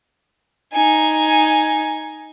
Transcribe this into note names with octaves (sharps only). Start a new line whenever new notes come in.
D#4 G#5